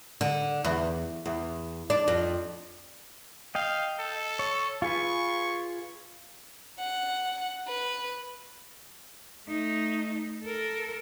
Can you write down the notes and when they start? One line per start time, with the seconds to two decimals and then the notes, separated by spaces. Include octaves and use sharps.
0.21 D3
0.64 E2
1.26 E2
1.90 D4
2.08 F2
3.55 D#5 F5 G5
3.99 A4
4.39 C#5
4.82 F4 G#4 B4 C#6
6.79 F#5
7.67 B4
9.47 A3 D#4
10.43 A4 A#4